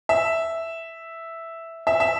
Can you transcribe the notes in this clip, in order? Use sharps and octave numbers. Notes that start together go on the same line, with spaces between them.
E5
E5
E5